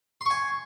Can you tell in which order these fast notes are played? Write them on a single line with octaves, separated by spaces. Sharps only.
C6 C#6 G#5